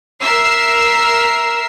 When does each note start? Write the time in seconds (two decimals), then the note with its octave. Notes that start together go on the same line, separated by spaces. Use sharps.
0.22 A#4 E5 E6 C7